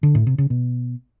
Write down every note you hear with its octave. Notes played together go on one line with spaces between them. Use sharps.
D3
A2
C3
C#3
B2